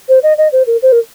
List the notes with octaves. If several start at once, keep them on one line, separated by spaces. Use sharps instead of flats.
C5
D#5
D#5
C5
A#4
C5
A#4